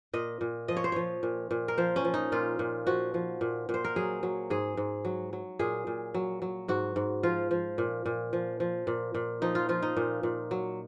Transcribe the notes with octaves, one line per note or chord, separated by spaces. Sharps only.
A#2 D#5
A#2
F3 D#5
C#5
C5
F3 C#5
A#2
A#2
A#4
F3 C5
C#4
F3
D#4
A#2 F4
A#2
F3 F#4
F3
A#2
A#2
C5
A#4
F#3 G#4
F#3
G#2 G#4
G#2
F#3
F#3
A#2 G#4
A#2
F#3
F#3
G#2 F#4
G#2
F3 F4
F3
A#2
A#2
F3
F3
A#2
A#2
F3 D#4
F4
F3 F4
D#4
A#2
A#2
F#3